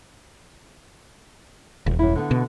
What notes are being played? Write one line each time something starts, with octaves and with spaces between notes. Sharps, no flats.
D#1
F#2 E4
D3 B3
B2